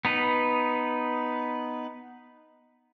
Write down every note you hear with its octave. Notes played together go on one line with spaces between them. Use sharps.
B3 D#4 B4